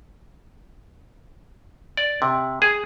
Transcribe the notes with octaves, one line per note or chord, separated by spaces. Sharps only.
D5
C3
G#4